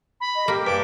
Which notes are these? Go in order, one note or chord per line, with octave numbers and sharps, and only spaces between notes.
B5
D#5
A#3 G4
G2 D7